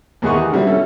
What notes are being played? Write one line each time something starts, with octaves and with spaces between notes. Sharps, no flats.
D#2 E3 G#3 G#4 F#5 C#6
G4
D3 F#3 G3 C4 E4 F#4
C#4 E4 A4